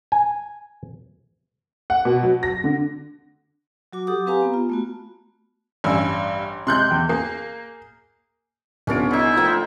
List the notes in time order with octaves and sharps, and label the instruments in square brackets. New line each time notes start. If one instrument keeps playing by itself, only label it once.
[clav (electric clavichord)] G#5
[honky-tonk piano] F#5
B2
F#3
A#6
D3
[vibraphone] F#3 F#4 D6
G4 A4 F#5 D6 D#6
C4 G4 B4 F5 G#5 A#5
B3 A#5
F4
A3 B3 F#4
[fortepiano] A1 G#5 E6 [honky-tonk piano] G2
[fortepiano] C3 G#3 [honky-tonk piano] C6 F#6 G6
[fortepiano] E2 G5
[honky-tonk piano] A#3 [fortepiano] G#4
[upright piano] C2 B3 D7 [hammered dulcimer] C#4 D4 F4
[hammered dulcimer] D3 D#4 [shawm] E4
[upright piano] F3 [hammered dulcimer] A3 A#3 G5